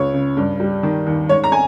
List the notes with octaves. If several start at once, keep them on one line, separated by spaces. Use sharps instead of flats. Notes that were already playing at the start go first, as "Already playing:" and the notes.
Already playing: C#2 C#5
C#3
G2
G3
D#3
D#2
G#2 C#5
A#5
G#5